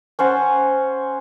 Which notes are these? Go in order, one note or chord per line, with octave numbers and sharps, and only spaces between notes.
C#4 C5 F#5 A5